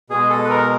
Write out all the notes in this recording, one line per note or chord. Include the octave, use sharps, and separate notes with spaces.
B2 G#3 G#4
A4
B4
A#4